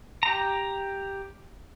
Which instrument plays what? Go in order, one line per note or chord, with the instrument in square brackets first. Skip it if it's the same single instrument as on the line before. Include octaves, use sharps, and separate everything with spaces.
[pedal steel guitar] G4 A#5